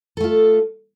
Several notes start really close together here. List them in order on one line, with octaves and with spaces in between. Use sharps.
A4 A3 F4